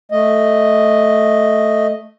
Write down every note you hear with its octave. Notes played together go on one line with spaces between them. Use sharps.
A3 D#5